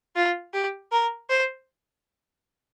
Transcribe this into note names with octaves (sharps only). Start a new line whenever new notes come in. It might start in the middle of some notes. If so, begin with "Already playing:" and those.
F4
G4
A#4
C5